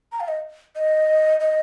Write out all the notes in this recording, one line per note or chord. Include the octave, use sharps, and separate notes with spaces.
A#5
F5
D#5
D#5
D#5